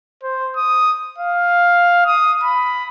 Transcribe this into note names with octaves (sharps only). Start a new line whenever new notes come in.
C5
D#6
F5
D#6
B5